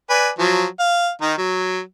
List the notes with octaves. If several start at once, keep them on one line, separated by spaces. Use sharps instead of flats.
B4 D5 G#5
F3 F#3
F5
D#3 D#4
F#3